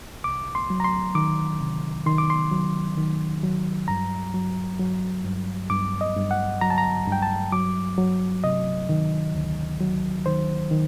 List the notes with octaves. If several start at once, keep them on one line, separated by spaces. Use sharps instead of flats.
C2 D6
C6
F#3
A#5
C6
D#3 D6
C3
D#3 C6
D6
C6
F#3
D#3
F#3
G2 A#5
F#3
F#3
G2
G2 D6
D#5
G2
F#5
F#3 A#5
A5
A#5
G2
G5
A5
F#3 D6
F#3
C3 D#5
D#3
D2
F#3
D#3 C5
D#3